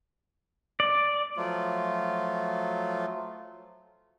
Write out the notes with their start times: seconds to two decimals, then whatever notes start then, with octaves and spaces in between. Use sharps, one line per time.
0.80 D5
1.37 F3 F#3 A3 F4